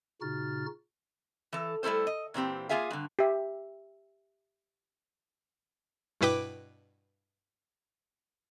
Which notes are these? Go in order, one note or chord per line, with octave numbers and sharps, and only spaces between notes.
A#2 C#3 D#4 F#4 F6 A6
E3 A4
G3 A3 E4 A4 C5
D#5
A#2 E3 C4 G4
A#3 B3 F4 G#4 E5 F5
G2 D3
G4 E5
G2 B2 E4 B4 G5 D6